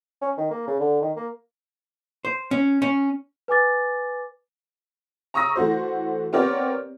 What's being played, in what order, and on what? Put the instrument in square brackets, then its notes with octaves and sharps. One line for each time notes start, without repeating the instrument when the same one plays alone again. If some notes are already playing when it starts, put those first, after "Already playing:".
[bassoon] C#4
D#3
A#3
C#3
D3
D#3
A#3
[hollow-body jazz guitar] C5
C#4
C#4
[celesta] B4 G#5 D6 A6
[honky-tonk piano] A#5 C#6 D#6 E6 A#6
E3 A3 F#4 C5
B3 C4 G4 A#4 C#5 D5